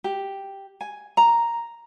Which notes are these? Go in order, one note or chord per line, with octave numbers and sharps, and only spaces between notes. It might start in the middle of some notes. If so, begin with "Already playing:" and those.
G4
G#5
A#5